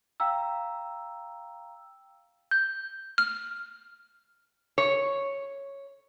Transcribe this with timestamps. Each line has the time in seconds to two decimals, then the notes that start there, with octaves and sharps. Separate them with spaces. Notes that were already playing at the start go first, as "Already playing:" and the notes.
0.20 F5 G5 A#5 E6
2.51 G6
3.18 F6
4.78 C#5